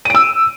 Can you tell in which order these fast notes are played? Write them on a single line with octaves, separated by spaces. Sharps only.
D#7 D7 E6